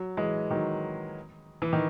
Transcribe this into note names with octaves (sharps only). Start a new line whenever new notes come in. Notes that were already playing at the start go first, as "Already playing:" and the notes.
Already playing: F#3
E3 G#3
D#3 F#3
E3
D#3